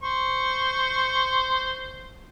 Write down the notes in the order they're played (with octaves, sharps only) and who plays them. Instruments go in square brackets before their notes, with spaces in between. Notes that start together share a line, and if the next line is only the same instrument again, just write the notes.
[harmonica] C5 C#6